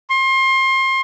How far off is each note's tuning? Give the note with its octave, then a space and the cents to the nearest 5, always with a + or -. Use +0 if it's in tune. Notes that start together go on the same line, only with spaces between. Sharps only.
C6 +30